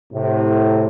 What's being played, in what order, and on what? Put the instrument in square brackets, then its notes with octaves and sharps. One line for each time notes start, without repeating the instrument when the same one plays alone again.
[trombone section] A2 C3